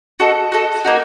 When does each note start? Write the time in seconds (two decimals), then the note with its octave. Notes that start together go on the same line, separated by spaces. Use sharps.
0.20 F#4 A4 D#5
0.52 F#4 A4 D#5
0.85 A#3 D#4 F#4